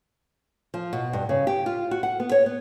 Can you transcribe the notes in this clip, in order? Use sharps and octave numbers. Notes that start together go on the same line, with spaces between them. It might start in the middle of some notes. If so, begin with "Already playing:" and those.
F3
B2
G2
C#3
G4
F4
F#4
F#5
B3
C#5
B3